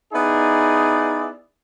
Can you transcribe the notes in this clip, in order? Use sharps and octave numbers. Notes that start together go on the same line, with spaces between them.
B3 D#4 E4 G#4 D5